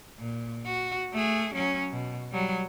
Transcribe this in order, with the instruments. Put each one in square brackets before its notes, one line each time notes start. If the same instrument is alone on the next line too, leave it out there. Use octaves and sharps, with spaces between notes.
[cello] A#2
F#4
A3 G#4
F#3 C#4
B2
F#3 G3